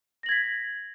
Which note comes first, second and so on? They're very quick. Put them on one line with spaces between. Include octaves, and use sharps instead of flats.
A#6 F#7 G#6 B6